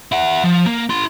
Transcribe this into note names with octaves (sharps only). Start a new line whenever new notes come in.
E4 F#5
F3
A#3
E4 C6